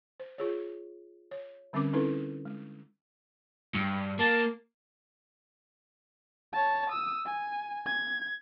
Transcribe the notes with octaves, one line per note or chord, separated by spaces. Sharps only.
C5
F4 G#4 C#5
C#5
D3 G3 C4 C#4 A#4 D6
C4 C#4 D#4 E4 A4 B4
G#3
G2
A#3 A5
C#5 A5
D#6 E6
G#5
G#6